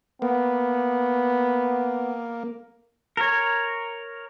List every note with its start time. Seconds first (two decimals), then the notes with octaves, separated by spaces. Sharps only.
0.22 A#3 B3
3.17 A#4 C#5